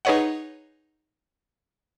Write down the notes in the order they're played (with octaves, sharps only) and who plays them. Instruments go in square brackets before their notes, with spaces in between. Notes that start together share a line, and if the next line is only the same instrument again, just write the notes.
[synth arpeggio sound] D#4 G#4 B4 C#5 D#5 F#5